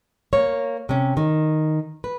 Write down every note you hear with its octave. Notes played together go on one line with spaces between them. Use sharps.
A#3 C#5
C3 C#4
D#3
B4